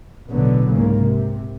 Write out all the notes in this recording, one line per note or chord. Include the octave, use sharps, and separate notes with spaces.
A1 B2 D3 F#3 B3
C2 G#2 C#3 A#3
C3